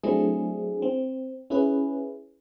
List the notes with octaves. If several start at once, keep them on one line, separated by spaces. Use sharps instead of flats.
F#3 A3 C4 D4 E4 G#4
C4
C#4 E4 G#4 B4